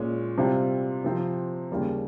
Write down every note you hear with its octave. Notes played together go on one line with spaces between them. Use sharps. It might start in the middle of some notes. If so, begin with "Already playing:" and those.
Already playing: A#2 G#3 C#4
C3 G3 C4 F4
C3 F3 C4 F4
D#2 C#3 G3 A#3